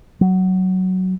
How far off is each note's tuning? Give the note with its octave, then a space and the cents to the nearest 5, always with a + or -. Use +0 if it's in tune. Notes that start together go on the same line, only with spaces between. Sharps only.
F#3 +10